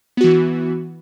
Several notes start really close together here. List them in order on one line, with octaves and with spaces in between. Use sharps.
B3 F#4 E3